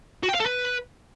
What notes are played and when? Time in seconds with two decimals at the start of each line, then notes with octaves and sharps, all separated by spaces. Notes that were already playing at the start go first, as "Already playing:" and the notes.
0.23 F#4
0.29 G5
0.35 F5
0.40 A4
0.46 B4